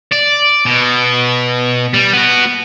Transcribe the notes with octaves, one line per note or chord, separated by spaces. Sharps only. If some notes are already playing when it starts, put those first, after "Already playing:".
D5
B2
G3
B3 F#4